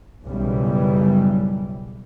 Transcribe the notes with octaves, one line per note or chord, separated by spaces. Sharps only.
B1 F#2 C#3 E3 G3